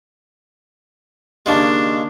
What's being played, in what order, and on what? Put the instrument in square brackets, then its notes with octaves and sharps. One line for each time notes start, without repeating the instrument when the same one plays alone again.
[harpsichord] D#2 C#3 G#3 [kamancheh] D4